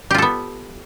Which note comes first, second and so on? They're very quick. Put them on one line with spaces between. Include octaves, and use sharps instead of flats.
G4 F4 A4 B3